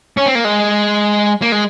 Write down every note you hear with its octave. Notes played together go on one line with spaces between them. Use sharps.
C#4
C4
A#3
G#3
A#3
G#3